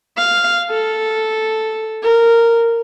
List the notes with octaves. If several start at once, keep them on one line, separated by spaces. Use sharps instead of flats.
F5
A4
A#4